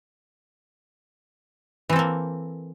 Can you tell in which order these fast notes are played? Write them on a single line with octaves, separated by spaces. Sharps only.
E3 C4 A4 A#3